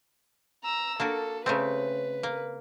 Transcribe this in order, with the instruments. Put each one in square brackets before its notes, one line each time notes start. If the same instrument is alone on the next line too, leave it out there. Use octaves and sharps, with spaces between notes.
[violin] A#5 E6
[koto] A#3 D4 F#4 [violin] A4
[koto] C#3 A3 C4 [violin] B4
[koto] A#3